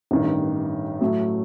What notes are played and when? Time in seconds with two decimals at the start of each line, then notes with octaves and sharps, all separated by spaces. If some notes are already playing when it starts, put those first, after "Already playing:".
0.11 A1 G2 D#3
1.01 A2 F#3 A3